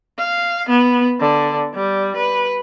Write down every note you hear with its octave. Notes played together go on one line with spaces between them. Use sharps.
F5
B3
D3
G3
B4